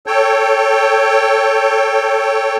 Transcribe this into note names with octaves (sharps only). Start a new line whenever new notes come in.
A4 C#5 G5